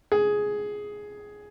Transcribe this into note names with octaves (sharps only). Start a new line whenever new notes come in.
G#4